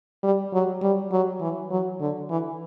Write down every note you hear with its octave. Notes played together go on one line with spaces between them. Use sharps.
G3
F#3
G3
F#3
E3
F#3
D3
E3